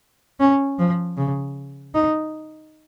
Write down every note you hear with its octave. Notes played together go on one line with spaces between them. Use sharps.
C#4
F3
C#3
D#4